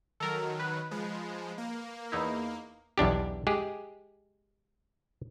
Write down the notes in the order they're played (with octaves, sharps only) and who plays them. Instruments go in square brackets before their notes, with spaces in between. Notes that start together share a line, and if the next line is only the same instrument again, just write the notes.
[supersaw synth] D#3 F#3 [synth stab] A4 A#4
[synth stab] B4
[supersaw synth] F3 G#3
A#3
[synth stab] E2 D#4 E4
[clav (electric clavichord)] B1 E2 D4 G4
G#3 G4 G#4